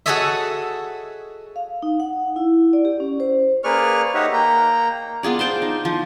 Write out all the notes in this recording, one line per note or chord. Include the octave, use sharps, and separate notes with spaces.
F#4 G#4 A4 C#5 D#5 E5
F5
D#4
F#5
E4
D5
G4
C#4
C5
A#3 G#4 B4 D5 C#6 F6
D#4 G4 C#5 D#5 E5 F#5
A#3 G5 A#5
B3 F4 G#4 D5
C5 G5 A5 C6
D#4
F3